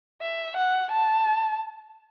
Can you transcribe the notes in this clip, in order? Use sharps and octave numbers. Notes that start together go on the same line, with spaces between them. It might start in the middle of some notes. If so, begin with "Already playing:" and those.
E5
F#5
A5